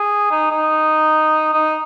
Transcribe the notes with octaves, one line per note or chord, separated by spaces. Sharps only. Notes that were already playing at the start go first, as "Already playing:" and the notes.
Already playing: G#4
D#4
D#4
D#4